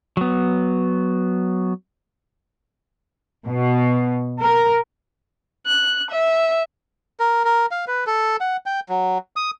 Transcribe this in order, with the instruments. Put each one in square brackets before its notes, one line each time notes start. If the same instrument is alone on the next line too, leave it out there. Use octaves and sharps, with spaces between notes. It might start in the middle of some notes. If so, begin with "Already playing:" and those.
[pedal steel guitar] F#3 B3
[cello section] B2
A#4
[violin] F#6
E5
[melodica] A#4
A#4
F5
B4
A4
F#5
G5
F#3
D#6